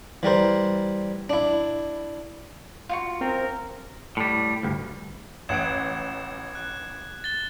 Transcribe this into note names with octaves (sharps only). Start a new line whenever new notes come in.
E3 G3 A#4 C5
D4 E4
F4 F#4 C#6
C4 A#4
A2 G3
D2 G2
A1 F#5 G#6 D7 E7
F#6
A6 G7